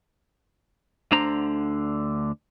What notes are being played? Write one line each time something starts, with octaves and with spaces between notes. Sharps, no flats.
D2 D3 D4 C5 A#5